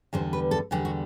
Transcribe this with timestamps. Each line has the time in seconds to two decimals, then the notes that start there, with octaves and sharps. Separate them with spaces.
0.13 E2 D3 G3 C5
0.33 B4
0.51 A4
0.71 E2 D3 G3 G4
0.85 F#4